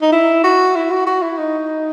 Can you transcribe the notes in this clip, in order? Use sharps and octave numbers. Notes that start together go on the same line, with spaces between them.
D#4
E4
F#4
E4
F#4
F#4
E4
D#4